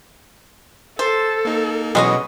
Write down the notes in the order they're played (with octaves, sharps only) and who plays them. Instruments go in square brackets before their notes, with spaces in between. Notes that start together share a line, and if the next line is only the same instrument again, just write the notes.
[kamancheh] A4 [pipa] C5 [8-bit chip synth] A6
[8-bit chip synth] A#3 D#4
[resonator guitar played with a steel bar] B2 [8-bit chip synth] E3 F#3 F#4 [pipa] G#3 C#4 D#5